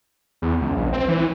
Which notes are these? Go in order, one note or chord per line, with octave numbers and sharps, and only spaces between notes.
E2
C#2
A#1
C4
E3